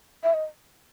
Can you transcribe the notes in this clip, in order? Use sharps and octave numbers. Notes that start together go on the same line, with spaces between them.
E5
D#5